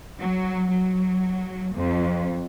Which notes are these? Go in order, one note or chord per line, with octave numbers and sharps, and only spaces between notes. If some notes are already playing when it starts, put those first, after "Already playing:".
F#3
F#3
F2